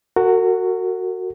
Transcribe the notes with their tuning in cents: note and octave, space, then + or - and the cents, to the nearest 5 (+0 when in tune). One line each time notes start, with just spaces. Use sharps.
F#4 +0 A#4 -40